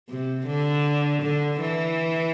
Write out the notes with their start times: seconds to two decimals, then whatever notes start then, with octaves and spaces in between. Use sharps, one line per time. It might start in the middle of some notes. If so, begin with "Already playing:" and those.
0.09 C3
0.47 D3
1.23 D3
1.60 E3